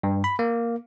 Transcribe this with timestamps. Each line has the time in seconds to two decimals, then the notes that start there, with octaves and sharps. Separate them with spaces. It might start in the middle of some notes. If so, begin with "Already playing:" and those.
0.03 G2
0.24 B5
0.39 A#3